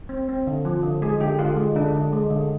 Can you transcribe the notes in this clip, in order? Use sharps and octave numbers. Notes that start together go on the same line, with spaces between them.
C4
C4
D3
F3
D3
G#3 G#4
D3 G4
D3 F4
G#3
D3 D4
D3
G#3
D3